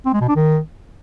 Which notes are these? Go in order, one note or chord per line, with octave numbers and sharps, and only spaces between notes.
C4
G#3
B2
D4
D#3